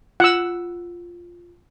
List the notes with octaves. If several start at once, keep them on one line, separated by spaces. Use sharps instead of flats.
F4 F#5 E6